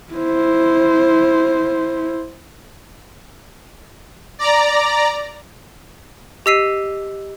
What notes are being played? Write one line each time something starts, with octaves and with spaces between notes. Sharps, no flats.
E4 C5
D5 A#5
G4 D#5 E6 B6 C7 D#7